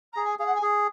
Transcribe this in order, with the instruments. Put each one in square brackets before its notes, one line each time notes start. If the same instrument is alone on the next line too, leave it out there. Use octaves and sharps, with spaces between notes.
[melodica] G#4 [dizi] A#5
[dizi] G#5
[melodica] G#4 [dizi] F5
[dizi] F#5
G#5
[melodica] G#4